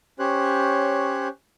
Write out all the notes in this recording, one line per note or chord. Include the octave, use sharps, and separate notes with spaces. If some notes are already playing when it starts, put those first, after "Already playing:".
C#4 G4 C5 C#5 F#6